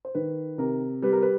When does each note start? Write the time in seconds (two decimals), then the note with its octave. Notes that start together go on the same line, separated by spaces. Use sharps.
0.05 C5
0.15 D#3 B4
0.58 C3 A#4
1.02 G3 B4
1.13 A#4
1.22 B4